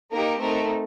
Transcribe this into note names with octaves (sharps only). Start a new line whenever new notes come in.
A#3 D#4 G4 A#4
A3 C4 D#4 A#4